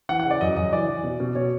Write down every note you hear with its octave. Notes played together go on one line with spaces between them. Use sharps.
E3 F#5
F#5
C#3
D5
F#2 D#5
F#2 D#5
E3 D5
E3
B2
B2
B2 C#5